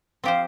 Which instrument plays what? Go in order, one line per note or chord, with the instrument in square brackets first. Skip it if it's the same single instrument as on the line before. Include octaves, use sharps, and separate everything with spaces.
[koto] F3 C4 G4 C5 [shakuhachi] F5